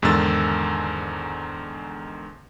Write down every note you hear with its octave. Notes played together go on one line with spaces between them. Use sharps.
E2 G#2 D3 D#3 E6 A6